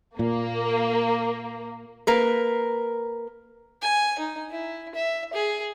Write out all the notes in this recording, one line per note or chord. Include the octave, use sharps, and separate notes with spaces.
A#2 A#3
A#3 A#4 B4
G#5
D#4
E4
E5
G#4